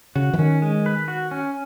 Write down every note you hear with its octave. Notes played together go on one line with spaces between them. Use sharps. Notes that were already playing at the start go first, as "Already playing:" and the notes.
C#3 F#4
E3
D#3 C#4
G#3
B4
F#4
C#4